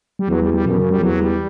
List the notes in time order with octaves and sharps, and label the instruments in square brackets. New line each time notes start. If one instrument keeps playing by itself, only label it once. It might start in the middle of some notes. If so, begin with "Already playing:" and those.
[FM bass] G3
[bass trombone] E2 [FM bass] F#3
[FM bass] G3
G3
[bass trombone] F#2 [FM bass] B2
[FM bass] C#3
G3
[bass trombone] E2 [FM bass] F#3
[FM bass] G3